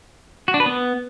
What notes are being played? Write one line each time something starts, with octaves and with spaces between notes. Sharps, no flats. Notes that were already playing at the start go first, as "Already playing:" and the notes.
F#4
D4
B4
B3